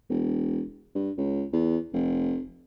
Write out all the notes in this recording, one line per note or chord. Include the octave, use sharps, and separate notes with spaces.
E1
G2
C#2
E2
F1